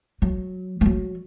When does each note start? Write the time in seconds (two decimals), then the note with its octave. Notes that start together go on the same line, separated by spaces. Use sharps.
0.22 F#3
0.81 G#3
0.86 F#3